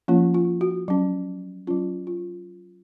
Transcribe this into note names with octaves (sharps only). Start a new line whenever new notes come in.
F3 A#3 C#4 F4
F4
F#4
F#3 C#4
F#3 C#4 F4
F4